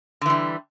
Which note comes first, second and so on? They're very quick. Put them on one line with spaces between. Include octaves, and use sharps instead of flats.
D3 E3 G3